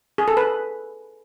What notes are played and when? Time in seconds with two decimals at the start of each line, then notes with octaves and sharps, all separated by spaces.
0.18 G#4
0.28 A4
0.37 B4